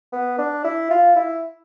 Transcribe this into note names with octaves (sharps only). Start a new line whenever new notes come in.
B3
D4
E4
F4
E4